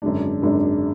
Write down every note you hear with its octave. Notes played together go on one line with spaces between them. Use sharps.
G#1 F#2 D3 G#3 D4
G#1 F#2 D3 G#3 D4